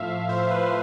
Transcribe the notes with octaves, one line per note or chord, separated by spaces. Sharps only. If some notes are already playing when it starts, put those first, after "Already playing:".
Already playing: A2 F3 E5 F5
A2 C5
B4